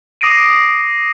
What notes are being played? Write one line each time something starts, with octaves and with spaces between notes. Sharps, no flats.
D6 D#6 A#6 C7 D7 D#7